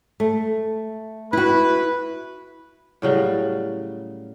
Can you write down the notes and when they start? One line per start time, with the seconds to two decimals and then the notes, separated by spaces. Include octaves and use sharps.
0.20 A3
1.33 E4 F#4 B4
3.02 A2 C#3 F#3 G3